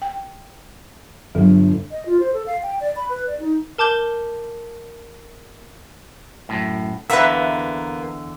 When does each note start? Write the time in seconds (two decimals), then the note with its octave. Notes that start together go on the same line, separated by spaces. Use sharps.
0.02 G5
1.35 G1 F#3
1.91 D#5
2.06 F4
2.20 C5
2.34 A4
2.46 F5
2.63 G5
2.80 D5
2.96 B5
3.09 B4
3.27 D5
3.40 D#4
3.78 A#4 A5 D6 G6 G7
6.49 F#2 A2
7.10 E2 D3 A#3 B3 B4 E5